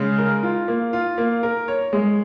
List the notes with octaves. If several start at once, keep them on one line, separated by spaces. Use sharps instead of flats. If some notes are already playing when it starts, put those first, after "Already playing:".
Already playing: C#3 G#3
A#4
F4
A#3
F4
A#3
A#4
C#5
G#3